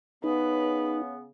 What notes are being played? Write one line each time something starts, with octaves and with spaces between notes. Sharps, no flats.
C#3 B3 D#4 B4